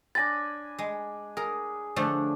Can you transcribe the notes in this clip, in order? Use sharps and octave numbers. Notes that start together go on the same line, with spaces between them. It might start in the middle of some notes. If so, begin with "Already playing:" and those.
D4 G#5 B5 A6 A#6
G#3
G#4 A#4
D3 F3 A3 D4